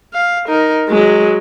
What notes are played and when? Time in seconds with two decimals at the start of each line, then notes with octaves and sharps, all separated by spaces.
0.13 F5
0.48 D#4 A#4
0.88 F#3 G#3